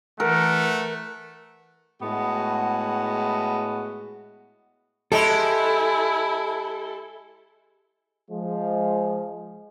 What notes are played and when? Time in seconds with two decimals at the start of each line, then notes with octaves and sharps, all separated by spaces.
0.20 E3 A3 A#4 F#5
2.01 A2 G#3 B3 F#4
5.12 G#3 E4 G4 A4
8.31 F3 G#3